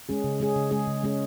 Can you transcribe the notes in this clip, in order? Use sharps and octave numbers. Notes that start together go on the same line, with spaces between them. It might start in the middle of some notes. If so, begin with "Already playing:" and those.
G#3 C#4 G#4
C#3
G#3 C#4 G#4
C#3
G#3 C#4 G#4
C#3
G#3 C#4 G#4